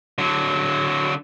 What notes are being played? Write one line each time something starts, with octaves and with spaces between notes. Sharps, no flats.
D3 F#3